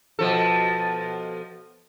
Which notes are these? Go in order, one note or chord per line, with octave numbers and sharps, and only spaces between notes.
B2 F3 A4